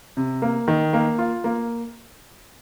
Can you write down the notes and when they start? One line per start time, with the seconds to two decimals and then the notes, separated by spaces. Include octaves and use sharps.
0.17 C3
0.42 A#3
0.68 D#3
0.93 A#3
1.19 F4
1.44 A#3